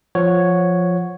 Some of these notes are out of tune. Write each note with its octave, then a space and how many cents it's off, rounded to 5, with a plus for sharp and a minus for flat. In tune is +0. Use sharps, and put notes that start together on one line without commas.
F3 +5 C#5 +0 F#5 -15